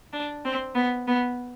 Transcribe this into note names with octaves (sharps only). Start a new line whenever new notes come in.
D4
C4
B3
B3